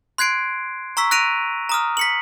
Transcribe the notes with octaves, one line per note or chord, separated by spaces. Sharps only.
C6 F#6 G#6 C7 D7
A#5 C#6 E6 B6
F#6 A#6 D7 D#7 F7
A#5 D#6 F6
B6 C#7 F#7